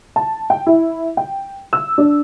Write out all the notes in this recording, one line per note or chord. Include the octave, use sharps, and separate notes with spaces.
A5
G5
E4
G5
E6
D4